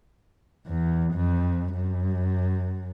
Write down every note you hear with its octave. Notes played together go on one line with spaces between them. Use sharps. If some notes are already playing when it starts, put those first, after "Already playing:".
E2
F2
F#2